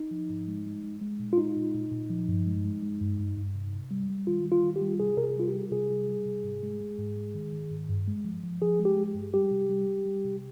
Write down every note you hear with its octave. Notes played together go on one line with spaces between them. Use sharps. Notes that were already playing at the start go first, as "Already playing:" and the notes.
Already playing: D#4
F3
G#2
G#3
G#3
G#3
G#3
A#2
F4
G#3 D#4
A#2
A#2
A#2
F3
G2
G#3
G#3
G#3
G2
G2
G2
C3
C3
G3
G3
D#3 F4
G3
F4
D#3
G4
G3
C3 G#4
C3 A#4
G#4
G3 F4
G4
G3
C3 G#4
G3
G3
C3
G#2
G#3
G#3
G#2
G#3
D#3
D#3
G#2
G2
G#3
F3
F3
F3 G#4
G#3
G4
G#3
G2
G3 G4
C3
G3
G3
G3
C3